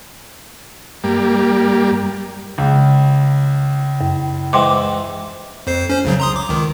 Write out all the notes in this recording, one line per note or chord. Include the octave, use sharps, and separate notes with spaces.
G2 G3 A#3
C#2
F#2
G#2 E3 G5 C6 D6
F2 C5 C7
C#4 C5
C2 C#3 F#3
A#5 C6 D#6
D6
C#2 D#3